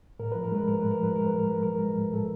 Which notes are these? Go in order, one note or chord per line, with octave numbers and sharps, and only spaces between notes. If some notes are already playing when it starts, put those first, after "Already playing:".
A2 A#4
F3 B4
A#4
G#3 B4
A2 A#4
A2 B4
A#4
F3 B4
G#3 A#4
A2 B4
A#4
A2 B4
F3 A#4
G#3
A2
A2 A4